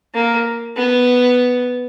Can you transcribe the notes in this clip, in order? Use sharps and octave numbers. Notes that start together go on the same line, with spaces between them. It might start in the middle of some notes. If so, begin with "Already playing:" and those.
A#3
B3